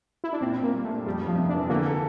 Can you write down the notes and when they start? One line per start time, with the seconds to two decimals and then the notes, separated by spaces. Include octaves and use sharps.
0.24 E4
0.33 D4
0.41 A#2 C4
0.57 A#2
0.63 A#3
0.74 G3
0.84 A3
0.90 D4
1.06 F2 G3
1.22 F2
1.28 F3
1.38 C3
1.49 E3 D4
1.69 D3 A#3
1.86 A4